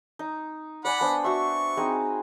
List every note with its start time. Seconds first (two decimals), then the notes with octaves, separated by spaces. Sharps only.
0.19 D#4
0.85 D5 F#5 G#5 B5
1.01 B3 D4 C5
1.24 F#4 E5 C#6
1.77 C4 D#4 G#4